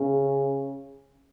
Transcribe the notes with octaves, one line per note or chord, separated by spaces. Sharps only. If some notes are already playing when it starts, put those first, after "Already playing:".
Already playing: C#3